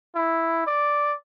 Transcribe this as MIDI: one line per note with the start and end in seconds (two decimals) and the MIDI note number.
0.15 0.62 64
0.67 1.14 74